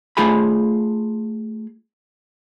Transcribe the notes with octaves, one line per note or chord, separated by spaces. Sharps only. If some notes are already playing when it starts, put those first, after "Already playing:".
A3 F4 G#4 G#5 B5